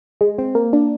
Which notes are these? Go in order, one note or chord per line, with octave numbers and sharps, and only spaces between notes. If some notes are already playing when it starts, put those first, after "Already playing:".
G#3
C4
A#3
D4